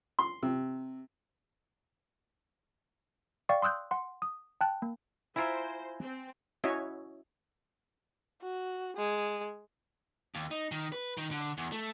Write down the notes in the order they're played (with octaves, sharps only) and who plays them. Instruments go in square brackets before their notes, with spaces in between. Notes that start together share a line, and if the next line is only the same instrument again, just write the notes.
[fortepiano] C6
C3
[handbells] D5 F5 G5 C#6
C6 D#6 E6 F#6 G6
F#5 C6
D#6
G5 A5 F#6
A#3
[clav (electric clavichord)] E4 F4 E5 [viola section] C5 [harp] G#5 A#5 D7
[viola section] C4
[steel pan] C#4 E4 F#4 C#5 D#5 E5
[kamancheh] F#4
G#3
[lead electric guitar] D#2
D#4
D#3
B4
D#3
D3
E2
A3